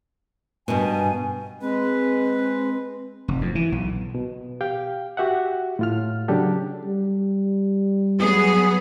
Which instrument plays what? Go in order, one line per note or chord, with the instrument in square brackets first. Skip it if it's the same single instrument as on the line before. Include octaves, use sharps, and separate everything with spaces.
[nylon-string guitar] G2 B2 [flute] G#5
[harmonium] G#3 B4 [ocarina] C4
[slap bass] F1
F2
E3
B1
[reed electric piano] B2
G4 F5 G5
F#4 G4 E5 F#5
A2 F4 F6
C#3 F#3 D4 G4 A4
[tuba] G3
[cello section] F#3 B3 G#4